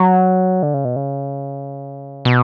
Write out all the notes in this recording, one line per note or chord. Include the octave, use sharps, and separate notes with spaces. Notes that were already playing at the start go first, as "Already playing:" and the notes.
Already playing: F#3
D3
C#3
B2
C#3
B2